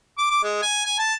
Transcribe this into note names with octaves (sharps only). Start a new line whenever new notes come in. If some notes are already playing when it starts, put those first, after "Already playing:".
D6
D6
G#3
G#5
G#5
A5